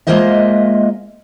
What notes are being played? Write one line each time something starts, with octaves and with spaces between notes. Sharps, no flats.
G#3 A#3 F4 C5 D#5 E5